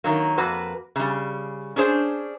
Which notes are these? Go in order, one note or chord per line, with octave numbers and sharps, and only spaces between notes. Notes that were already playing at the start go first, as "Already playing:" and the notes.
D#3 F#3 A#3
F2 A#3 F#4 B4
C#3 G3
C#4 D4 G#4 C5